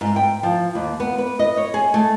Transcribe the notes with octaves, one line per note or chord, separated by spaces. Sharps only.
G#2
G5
F3
D#2
B3
B4
D#5
C#5
G#4
A3